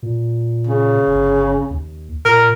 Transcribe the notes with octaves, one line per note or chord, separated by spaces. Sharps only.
A#2
C#3
G1
D#2
A#2 A#4